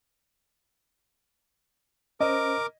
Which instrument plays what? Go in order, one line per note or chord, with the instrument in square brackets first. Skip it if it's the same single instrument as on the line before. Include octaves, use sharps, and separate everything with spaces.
[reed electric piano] C#4 C5 [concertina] A#4 D6 [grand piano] D#5